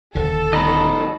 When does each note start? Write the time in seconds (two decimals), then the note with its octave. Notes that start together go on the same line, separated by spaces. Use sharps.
0.15 D#1 D3 A4
0.53 G2 B2 D#3 D#5 A#5 B5